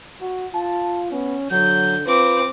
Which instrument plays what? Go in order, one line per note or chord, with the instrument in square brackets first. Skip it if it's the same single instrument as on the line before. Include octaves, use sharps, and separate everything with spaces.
[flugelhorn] F#4
[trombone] F4 [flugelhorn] A5
[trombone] B3 [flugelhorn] C#4
[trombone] D3 [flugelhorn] F#3 [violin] G6
[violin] C4 D6 [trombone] F4 [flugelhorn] B4